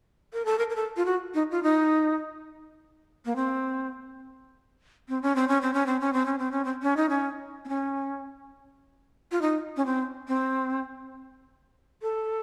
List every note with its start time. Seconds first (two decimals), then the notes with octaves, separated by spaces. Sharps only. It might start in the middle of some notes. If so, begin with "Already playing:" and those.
0.33 A#4
0.45 A4
0.59 A#4
0.70 A#4
0.76 A4
0.97 F4
1.06 F#4
1.34 D#4
1.51 F4
1.63 D#4
3.25 A#3
3.36 C4
5.09 C4
5.22 C#4
5.36 C4
5.48 C#4
5.61 C4
5.74 C#4
5.86 C4
6.00 C#4
6.13 C4
6.26 C#4
6.39 C4
6.51 C#4
6.65 C4
6.83 C#4
6.97 D#4
7.09 C#4
7.65 C4
7.69 C#4
9.32 F4
9.42 D#4
9.77 C#4
9.86 C4
10.28 C4
12.02 A4